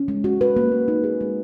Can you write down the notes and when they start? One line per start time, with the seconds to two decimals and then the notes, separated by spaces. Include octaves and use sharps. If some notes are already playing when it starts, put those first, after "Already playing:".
Already playing: C#4
0.08 G#3
0.24 F#4
0.41 B4
0.56 A#3
0.72 A#3
0.88 D#4
1.04 G#4
1.21 G#3